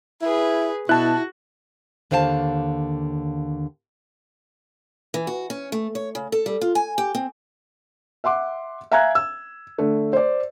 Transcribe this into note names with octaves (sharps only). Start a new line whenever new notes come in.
E4 G#4 B4
B2 E4 F#4 A5 F#6
D#2 D3 C5 F5 G5 A5
E3
F#4
C#4
A3
C#5
C#3
A4
G3
F4
G#5
G4
C4
E5 F#5 C6 D6
E5 F5 G#5 A#5 F#6 G#6
E6
D3 A3
C5 D5